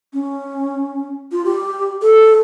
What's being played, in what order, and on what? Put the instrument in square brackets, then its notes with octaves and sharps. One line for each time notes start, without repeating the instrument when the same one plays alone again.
[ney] C#4
F4
G4
A4